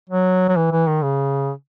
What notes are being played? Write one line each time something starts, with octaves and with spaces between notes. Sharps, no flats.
F#3
F#3
E3
E3
D#3
C#3